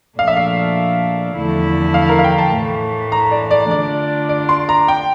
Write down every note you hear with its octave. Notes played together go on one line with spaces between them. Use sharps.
A#2 F3 A3 D4 F5
E5
F5
E2 D3 F3 A3 E4
F5
A#4
F5
G5
A5
A2 E3 A3
A#5
D5
D5
D3 A3 D4 F4 D5
D5
C6
A#5
G5